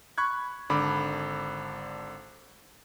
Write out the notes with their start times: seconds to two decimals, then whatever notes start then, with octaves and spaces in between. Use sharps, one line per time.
0.18 B5 C#6 F#6 G#6
0.70 G#1 D3 B5 D6